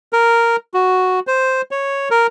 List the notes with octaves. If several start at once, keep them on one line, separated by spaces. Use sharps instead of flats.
A#4
F#4
C5
C#5
A#4